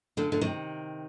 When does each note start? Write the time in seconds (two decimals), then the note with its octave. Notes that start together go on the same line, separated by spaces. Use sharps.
0.17 A#2 D3
0.32 D3
0.41 C3 D#3